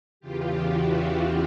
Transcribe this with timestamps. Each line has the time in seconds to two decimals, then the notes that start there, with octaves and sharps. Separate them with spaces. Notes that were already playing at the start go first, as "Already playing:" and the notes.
0.20 E2 C#3 E3 F4 G4
0.60 E4 F#4